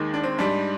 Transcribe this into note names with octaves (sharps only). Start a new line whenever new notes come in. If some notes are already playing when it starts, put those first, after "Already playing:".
Already playing: D#2 D#3 G#3
D4
C4
G#2 G3 D4